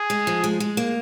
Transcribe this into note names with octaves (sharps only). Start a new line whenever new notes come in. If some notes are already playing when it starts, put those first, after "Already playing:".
Already playing: G#4
G#3
F3
G#3
G#3
A#3